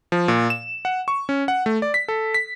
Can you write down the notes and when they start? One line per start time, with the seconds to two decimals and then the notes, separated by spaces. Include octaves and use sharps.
0.12 F3
0.28 A#2
0.50 E7
0.85 F#5
1.08 C#6
1.29 C#4
1.48 F#5
1.66 A3
1.82 D5
1.94 B6
2.08 A4
2.34 B6